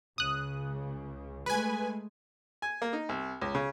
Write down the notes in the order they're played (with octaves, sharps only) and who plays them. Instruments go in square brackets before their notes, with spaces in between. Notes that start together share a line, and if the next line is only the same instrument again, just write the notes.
[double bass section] C#2 C#3 [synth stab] D#6 F#6
[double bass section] G#3 A3 [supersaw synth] B4 G#5
[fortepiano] G#5
A#3
D#4
C2
C#2
C#3